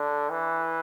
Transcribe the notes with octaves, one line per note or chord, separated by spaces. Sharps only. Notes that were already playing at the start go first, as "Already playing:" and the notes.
Already playing: D3
E3